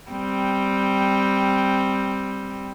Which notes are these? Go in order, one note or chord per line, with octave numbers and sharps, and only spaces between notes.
G3 C4